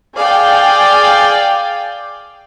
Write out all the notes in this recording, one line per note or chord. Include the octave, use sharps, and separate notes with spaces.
G#4 D5 F5 G5